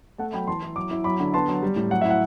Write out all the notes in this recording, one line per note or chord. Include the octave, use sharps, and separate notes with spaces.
A3 F#5 A5
F#3 G5 B5
E3 A5 C6
E4
F#3 D6
E4
F#3 B5 D6
D3
B3 A5 C6
F#3
G3
A2
F#3 F#5
E4 E5
F#5